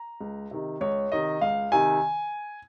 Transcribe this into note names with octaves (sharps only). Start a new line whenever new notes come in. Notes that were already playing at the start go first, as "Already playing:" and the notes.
Already playing: A#5
C#2
C3 D#3
C#2 C#5
C3 D#3 D#5
C#2 F5
C3 D#3 G#5